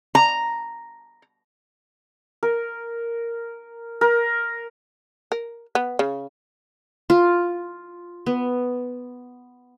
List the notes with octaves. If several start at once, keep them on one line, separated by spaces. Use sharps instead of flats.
A#5
A#4
A#4
A#4
B3
C#3
F4
B3